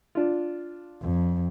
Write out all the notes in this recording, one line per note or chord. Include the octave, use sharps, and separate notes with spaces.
D4 F4
F2